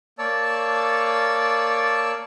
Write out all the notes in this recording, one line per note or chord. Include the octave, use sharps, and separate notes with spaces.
A#3 C#5 D5 A5 E6